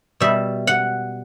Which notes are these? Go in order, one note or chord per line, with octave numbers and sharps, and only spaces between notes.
B2 G3 E5
F#5